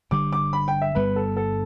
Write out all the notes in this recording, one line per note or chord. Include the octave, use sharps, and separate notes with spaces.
G1 G2 D3 G3 D6
D6
B5
G5
E5
G1 G2 G3 B3 B4
A4
A4